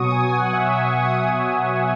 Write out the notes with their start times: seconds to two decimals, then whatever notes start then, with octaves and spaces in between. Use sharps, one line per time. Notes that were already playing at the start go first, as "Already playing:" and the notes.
Already playing: B2 F#3 C#6 D#6
0.12 G#5
0.32 F#5
0.53 B2 F#3 E5
0.82 C#6
0.93 D#6
1.34 B2 F#3